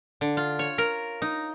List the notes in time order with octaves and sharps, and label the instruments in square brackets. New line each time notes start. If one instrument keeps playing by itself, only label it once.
[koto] D3
F4
C#5
A#4
D#4